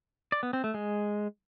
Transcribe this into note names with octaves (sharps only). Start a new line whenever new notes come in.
D5
B3
C4
A3
G#3